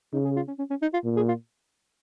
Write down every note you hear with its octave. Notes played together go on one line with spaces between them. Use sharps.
C#3 D#4
G#4
F4
C#4
C#4
C#4
D#4
F4
A#2
G#4
F4